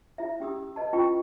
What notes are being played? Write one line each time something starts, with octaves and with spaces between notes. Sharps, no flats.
E4 E5
C#4 G4 D#6 E6
B4 D#5 A5
C#4 E4 F4 B4 G5 C#6